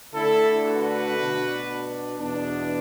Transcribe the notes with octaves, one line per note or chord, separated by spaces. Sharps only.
D3 A3 D4 E4 A4
F#4 B4
B2 B3 D4
E2 B2 B3 D4